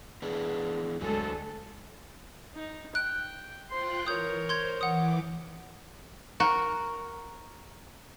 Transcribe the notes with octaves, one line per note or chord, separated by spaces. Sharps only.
E3 B3 D4 G#4
D2 D3 F#3 G#3 A4 G#5
D#4
G5 F#6 D7
F4 C5 G5 C6 F#6
E3 A#4 C#5 D#6 G6
C5 C6 G6 G#6
E3 F#5 D6 D#6
F#4 A#4